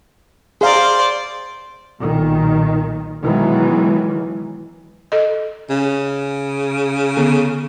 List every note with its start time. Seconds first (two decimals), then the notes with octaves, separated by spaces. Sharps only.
0.61 G#4 C5 D5 F5 A#5
2.00 B1 A#2 D#3
3.22 B2 D#3 E3 F#3 G#3
5.12 A4 D#5
5.69 C#3
7.17 D3 B3